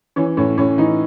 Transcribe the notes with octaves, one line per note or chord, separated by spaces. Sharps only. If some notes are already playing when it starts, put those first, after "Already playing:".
E3 C#4
A2 C#4
A2 C#4
E3 D#4